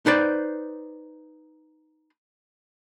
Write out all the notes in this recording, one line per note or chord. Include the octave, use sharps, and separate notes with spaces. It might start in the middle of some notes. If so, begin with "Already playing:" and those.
D#4 B4 C5 D5